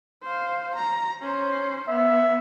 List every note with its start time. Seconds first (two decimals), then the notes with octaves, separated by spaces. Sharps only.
0.23 C5 F5
0.76 A#5
1.22 C#4 C5
1.89 B3 E5